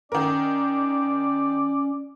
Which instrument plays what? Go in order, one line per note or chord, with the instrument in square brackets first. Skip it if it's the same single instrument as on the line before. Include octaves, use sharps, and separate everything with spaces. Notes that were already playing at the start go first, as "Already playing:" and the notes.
[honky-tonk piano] D#3 A#4 [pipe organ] C#4 [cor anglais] D5